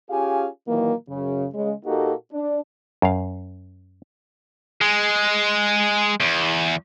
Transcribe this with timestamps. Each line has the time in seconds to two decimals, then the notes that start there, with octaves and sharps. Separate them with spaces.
0.11 C#4 F4 G4 G#4 F5 G#5
0.68 A#2 D#3 E3 F#3 A#3
1.09 F#2 C#3
1.53 C#3 G#3
1.85 A#2 A#3 D#4 F#4 G4 A4
2.32 D4
3.02 F#2 F5
4.81 G#3
6.20 E2